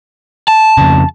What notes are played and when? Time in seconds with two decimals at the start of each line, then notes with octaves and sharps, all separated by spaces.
0.48 A5
0.78 F2 C#3